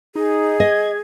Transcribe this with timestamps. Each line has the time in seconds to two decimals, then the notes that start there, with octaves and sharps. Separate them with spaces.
0.15 D#4 G#4
0.60 D#5 G#6